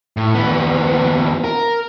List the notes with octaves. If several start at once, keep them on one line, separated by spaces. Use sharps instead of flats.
A2
D#2 B3
A#4